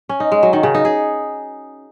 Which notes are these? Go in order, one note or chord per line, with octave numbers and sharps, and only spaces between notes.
C#4
D#4
G#3
F#3
D#3
C#3
D#4
G#4